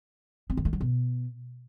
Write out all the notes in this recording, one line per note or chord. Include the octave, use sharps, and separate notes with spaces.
C4
D#3
A3
F#3
B2